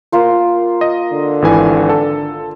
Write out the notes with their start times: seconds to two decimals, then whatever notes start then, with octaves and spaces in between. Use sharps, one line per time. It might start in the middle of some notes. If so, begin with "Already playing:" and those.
0.12 A#3 F4 C5
0.81 D#5
1.12 D3
1.42 G#1 E3 G#5
1.89 A4